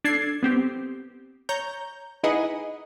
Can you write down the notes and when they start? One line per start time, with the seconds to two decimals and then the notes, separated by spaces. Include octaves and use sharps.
0.04 D4 A4 G#6 C7
0.43 B3 C4 G4
1.49 C#5 A#5 G6
2.24 D#4 E4 G#4 B4 D#5 F#5